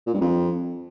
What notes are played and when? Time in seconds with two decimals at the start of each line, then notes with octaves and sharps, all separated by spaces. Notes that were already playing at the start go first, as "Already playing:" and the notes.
0.07 A#2
0.14 G2
0.21 F2